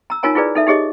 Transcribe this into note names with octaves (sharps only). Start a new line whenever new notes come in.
A#5 E6
D#4 F4 A#4 C#5 G#5 A#5
E4 F4 G#4 B4 D5
D#4 A4 E5
D#4 G4 G#4 C#5 D#5